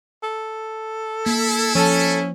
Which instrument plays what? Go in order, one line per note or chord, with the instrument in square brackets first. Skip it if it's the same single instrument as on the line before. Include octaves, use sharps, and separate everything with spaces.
[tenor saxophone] A4
[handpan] A#3 [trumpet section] E4
[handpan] F3 [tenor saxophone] C#4 [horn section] A4